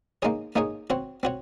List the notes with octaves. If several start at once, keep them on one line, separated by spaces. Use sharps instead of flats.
A#3 D#4 G#4 C#5
A#3 D#4 G#4 C#5
C4 F#4 C#5
C4 F#4 C#5